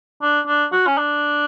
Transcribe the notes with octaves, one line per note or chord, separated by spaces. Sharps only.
D4
D4
F#4
C#4
D4